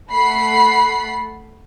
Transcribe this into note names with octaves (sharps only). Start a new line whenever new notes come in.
A3 F#5 B5 C7